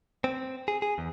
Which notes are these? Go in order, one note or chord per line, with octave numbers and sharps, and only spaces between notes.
C4
G#4
G#4
E2